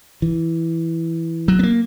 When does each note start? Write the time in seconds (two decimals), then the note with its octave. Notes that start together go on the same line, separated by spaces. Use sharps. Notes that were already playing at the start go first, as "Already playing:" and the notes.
0.22 E3
1.48 F#3
1.59 B3
1.63 A#3